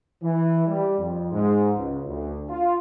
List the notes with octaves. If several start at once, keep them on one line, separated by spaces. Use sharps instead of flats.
E3
G3
F2
G#2
C#2
D2
F4